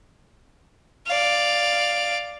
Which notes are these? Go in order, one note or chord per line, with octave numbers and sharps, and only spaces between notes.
D5 F5